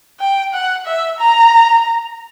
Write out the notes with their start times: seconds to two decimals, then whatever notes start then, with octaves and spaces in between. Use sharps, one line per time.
0.20 G5
0.53 F#5
0.86 E5
1.19 A#5